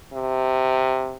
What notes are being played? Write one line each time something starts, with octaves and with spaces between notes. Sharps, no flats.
C3